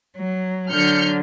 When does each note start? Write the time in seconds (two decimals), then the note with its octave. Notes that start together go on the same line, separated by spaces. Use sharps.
0.17 F#3
0.72 D3 F#3 F6 G6 C#7